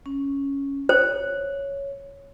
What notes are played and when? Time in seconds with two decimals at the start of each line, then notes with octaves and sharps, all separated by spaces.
0.06 C#4
0.89 C5 C#5